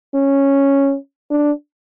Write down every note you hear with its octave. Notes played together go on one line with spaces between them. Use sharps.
C#4
D4